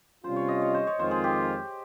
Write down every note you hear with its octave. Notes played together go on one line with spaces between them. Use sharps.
C3 G3 C#4 F4 C5
C#5
D#5
C#5
C5
C#5
F2 D#3 G#3 C4 F4 C5
G#4
G4